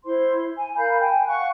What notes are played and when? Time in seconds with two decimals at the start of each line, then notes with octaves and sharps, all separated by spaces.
0.04 E4 C5 C6
0.57 G#5
0.76 A#4 F5 B5 G6
1.00 G5 G#5
1.27 F5 F#5 C#6 F#6